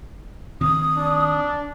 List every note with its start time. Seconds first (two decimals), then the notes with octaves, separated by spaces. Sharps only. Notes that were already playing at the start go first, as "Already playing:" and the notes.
0.61 D2 D#3 C4 D#6
0.97 D4